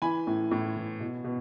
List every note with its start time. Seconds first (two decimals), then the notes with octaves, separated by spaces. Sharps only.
0.02 E3 G#5 B5
0.27 A2
0.51 A2
0.76 E3
1.00 B2
1.24 B2